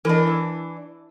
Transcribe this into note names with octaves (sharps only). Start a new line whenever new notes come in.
E3 D4 A#4 C#5 D#5
E4 E5